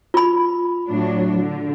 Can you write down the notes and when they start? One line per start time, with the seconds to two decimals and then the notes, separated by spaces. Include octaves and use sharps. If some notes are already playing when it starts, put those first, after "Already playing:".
0.14 F4 B5
0.87 A2 F#3 D4
1.40 D3